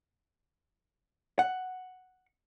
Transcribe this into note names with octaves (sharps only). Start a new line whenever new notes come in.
F#5